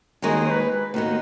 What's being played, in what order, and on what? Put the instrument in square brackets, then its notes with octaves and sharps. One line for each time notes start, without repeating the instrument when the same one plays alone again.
[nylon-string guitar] D#2 D#3 G#3 D#4 F#4 [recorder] G#4
[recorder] C#5
B4
[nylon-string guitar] D#2 D#3 B3 [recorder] F#4